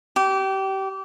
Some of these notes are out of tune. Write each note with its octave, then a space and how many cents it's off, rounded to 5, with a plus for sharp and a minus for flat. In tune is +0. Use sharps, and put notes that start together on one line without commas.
G4 -25